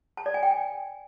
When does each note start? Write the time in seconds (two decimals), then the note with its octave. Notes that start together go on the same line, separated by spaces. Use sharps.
0.17 A5
0.26 D5
0.34 G#5
0.43 G5
0.51 G#5